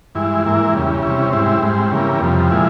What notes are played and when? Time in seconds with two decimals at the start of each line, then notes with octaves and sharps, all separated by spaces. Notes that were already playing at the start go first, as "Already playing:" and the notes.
0.15 G2 E3 G#3 E4
0.45 G#2 E3 A#3 E4
0.74 E2 C#3 G3
1.03 C3 G3 C#4 E4
1.32 G#2 G3 C4 E4
1.63 G#2 G3 C4
1.91 C#3 E3 G3 A#3
2.21 F2 C3 G3
2.50 A#2 F3 G#3 E4